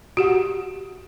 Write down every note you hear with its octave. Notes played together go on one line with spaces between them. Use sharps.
F#4 G4 F#5